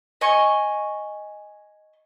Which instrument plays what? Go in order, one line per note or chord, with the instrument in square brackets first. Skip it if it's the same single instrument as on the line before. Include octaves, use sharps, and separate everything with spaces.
[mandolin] D#5 G#5 C#6